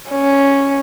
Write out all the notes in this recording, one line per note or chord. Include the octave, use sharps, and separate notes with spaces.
C#4